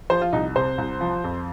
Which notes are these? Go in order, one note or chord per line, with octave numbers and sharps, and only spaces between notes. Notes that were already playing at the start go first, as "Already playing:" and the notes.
F3 C5
F4
C2 D#4
C3 C5
C2
F3
F2